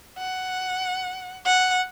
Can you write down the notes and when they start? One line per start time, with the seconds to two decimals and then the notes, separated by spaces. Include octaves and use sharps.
0.18 F#5
1.46 F#5